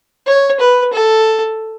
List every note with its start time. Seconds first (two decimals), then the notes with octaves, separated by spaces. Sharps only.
0.27 C#5
0.60 B4
0.93 A4